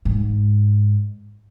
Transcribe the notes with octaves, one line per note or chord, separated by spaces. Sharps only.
G#2